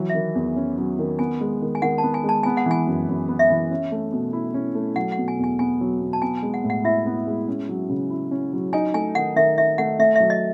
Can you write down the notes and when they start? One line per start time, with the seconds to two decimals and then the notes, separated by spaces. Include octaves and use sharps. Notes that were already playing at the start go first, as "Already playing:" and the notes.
Already playing: E3 F#3
0.09 D#3 E5
0.35 E2
0.56 C#4
0.78 F#3
0.99 D#3
1.19 B3 G#5
1.41 G#3
1.62 D#3
1.75 G#5
1.82 D#3 F#5
1.98 B3 A5
2.14 G#5
2.24 G#3
2.29 A5
2.43 B3 G#5
2.57 F#5
2.66 E3 G#5
2.87 F#2
3.08 F#2
3.29 B3
3.39 E5
3.50 E3
3.71 C#4
3.92 A3
4.13 B2
4.33 E4
4.54 C#4
4.75 A3
4.96 F#3 F#5
5.12 F#5
5.18 B2
5.28 G#5
5.39 E2 G#5
5.59 B3 G#5
5.81 F#3
6.01 B2
6.13 A5
6.22 B3 G#5
6.38 G#5
6.43 G#3
6.54 F#5
6.64 A2
6.70 F#5
6.84 E4 E5
7.06 B3
7.27 G#3
7.48 C#4
7.69 F#3
7.89 C#3
8.10 E4
8.31 C#4
8.53 F#3
8.73 D#4 G#5
8.94 A3 G#5
9.15 D#3 F#5
9.36 D#3 E5
9.57 D#4 E5
9.78 A3 F#5
9.99 A3 E5
10.15 F#3 E5
10.30 D#5